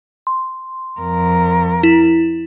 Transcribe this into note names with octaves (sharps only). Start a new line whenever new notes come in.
C6
F2 A#4
E4